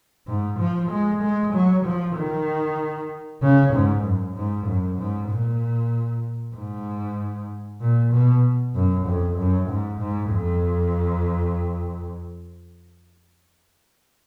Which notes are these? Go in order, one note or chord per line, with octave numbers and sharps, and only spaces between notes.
G#2
F3
G#3
G#3
F#3
F3
D#3
C#3
G#2
F#2
G#2
F#2
G#2
A#2
G#2
A#2
B2
F#2
F2
F#2
G#2
G#2
F2